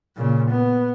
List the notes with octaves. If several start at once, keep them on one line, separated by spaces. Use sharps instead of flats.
A#2 C#3
B3